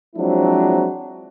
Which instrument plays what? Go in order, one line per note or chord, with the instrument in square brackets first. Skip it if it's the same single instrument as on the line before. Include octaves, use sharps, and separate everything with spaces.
[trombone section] F3 F#3 G#3 C4 D4 E4